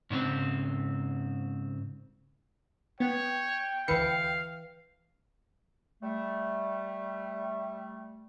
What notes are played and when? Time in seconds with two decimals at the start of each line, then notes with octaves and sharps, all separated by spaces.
0.10 G#2 C#3 C4
3.00 B3 C#5 G5
3.88 D2 E3 F5 C#7
6.02 G3 A3